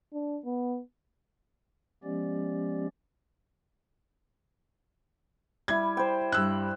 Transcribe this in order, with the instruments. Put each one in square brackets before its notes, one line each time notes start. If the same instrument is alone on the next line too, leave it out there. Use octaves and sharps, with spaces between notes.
[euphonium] D4
B3
[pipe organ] F3 G#3 B3 C#4 G4 D5
[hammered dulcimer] G3 E4 [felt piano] G#6
[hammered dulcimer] C5 G5
[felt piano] G2 E6 F#6